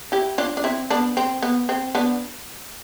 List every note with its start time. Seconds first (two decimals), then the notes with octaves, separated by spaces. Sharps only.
0.12 E4 G4
0.38 D4 F4
0.57 D4
0.64 C4 E4
0.90 B3 D4
1.17 C4
1.43 B3
1.69 C4
1.95 B3 D4